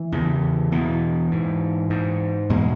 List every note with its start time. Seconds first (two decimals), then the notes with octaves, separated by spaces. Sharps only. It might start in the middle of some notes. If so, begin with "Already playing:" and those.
Already playing: E3
0.12 E2 C#3
0.72 E2 B2 E3
1.31 G#2
1.90 G#2
2.50 E2 B2 G#3